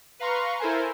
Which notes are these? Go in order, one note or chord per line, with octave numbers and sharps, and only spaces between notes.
B4 F5 A#5 C6 C#6
E4 A4 A#4 C5 G#5